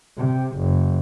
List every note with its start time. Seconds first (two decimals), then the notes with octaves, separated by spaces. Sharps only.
0.18 C3
0.57 F#1